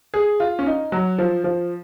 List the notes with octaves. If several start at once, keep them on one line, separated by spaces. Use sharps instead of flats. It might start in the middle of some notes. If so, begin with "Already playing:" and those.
G#4
F4
C#4
D#4
F#3
F3
F3